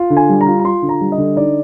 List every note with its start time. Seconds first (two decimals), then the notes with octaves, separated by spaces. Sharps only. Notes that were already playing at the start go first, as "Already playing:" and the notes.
Already playing: F4
0.10 D3
0.17 G#5
0.29 G3
0.41 A#5
0.46 F4
0.59 A#5
0.64 F4 C6
0.82 D3
0.89 A#5
1.01 G3
1.12 D#5
1.18 D3
1.36 D#4 D5